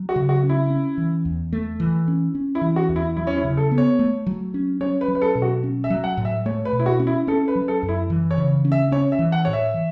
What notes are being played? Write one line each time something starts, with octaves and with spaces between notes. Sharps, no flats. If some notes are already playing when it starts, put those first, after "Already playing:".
Already playing: F#3
F#4
C#3
F#4
C#4
E4
C#4
E3
E2
A3
E3
C#4
C#4
E4
E3
F#4
E2
E4
F#3 E4
C#4
E4
C#3
A4
B3
C#5
A3
F#3
C#4
C#4 C#5
B4
F#3
B4
A4
B2
F#4
C#4
E5
F#3
F#5
A2
E5
A3 C#5
B4
B2
E4
F#4
C#4
E4
C#4 A4
B4
F#3
A4
F#2
E4
E3
C#5
C#3
C#4
E5
C#4 C#5
E5
E3
F#5
A2 C#5
E5
E3